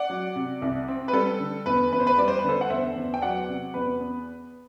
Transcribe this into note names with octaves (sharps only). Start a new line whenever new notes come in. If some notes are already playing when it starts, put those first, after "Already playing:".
Already playing: D5 F#5
F#3
C3
C2
C4
B4
G3 A4
D3
E2 B4
E2 B4
C5
B4
G3 D5
C5
B4
D3 A4 C5
F#5
E2 C5 E5
E2
G5
F#3 D5 F#5
C3
E2 B4
B3